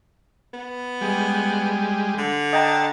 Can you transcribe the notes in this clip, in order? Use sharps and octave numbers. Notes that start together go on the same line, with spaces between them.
B3
G3 G#3
D3
D#5 G5 A5 A#5